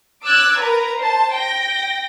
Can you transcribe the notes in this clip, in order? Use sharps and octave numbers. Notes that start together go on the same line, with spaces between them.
D6 E6 F#6 G#6 A6
A#4 B4 A#5
C5 A5
G5 A#6